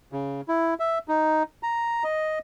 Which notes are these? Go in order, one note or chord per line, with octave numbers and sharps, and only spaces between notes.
C#3
E4
E5
D#4
A#5
D#5